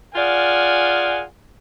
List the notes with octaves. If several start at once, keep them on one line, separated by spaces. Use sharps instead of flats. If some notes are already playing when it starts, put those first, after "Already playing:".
F4 G#4 A#4 D5 F#5 G#5